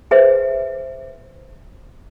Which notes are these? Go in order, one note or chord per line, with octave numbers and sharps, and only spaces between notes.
G#4 B4 C5 E5